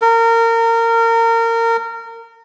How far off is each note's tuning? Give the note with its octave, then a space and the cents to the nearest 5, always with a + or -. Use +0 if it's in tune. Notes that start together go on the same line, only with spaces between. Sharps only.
A#4 -25